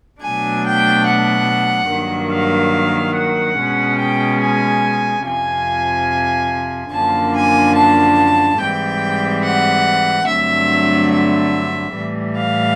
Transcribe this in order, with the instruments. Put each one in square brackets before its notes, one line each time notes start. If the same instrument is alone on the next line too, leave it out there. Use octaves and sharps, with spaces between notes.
[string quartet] B2 F#3 A3 D4 G#5
G5
F#5
G2 D#3 F#3 A#3
F5
F#5
B2 G#3 C#4
G5
G#5
F2 C3 F3 G#5
F#2 D3 F3 A#3 D4 A5
G#5
A5
G#2 E3 G3 C4 G5
F#5
G2 D3 F#3 A3 C4 E5
E5
A2 E3 G3
F5